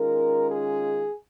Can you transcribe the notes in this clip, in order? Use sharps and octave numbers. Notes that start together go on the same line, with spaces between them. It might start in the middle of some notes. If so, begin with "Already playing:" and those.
Already playing: D#3 G#3 C#4 F4 A#4
G#4